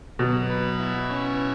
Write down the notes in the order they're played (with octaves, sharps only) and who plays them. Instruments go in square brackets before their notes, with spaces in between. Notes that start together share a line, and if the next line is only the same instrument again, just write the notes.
[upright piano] B2 [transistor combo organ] F#3
[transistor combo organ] B4
E4
C#4